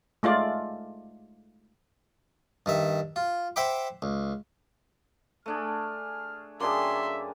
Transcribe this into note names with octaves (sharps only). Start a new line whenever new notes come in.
G#3 A3 F4 D5
G2 D#3 E5
F4
C5 E5 F#5 G5 B5 D6
C#2
A3 D4 G#4 F6
F#2 A#3 D4 G4 G#4 E5 C6